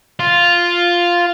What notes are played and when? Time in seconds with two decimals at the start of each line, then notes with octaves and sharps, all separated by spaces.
0.19 F4